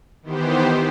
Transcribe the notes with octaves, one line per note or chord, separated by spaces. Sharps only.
D#3 E3 B3 G4 C5